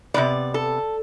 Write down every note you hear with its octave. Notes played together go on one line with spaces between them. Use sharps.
C3 E3 B3 D5
A4